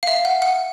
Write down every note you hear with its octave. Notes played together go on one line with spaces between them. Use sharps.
F5
E5
F#5
F#5